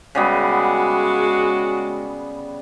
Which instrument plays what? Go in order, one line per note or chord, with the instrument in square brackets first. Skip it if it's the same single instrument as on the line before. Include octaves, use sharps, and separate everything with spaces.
[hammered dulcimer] C#3 G3 B3 [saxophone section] G#3 F#4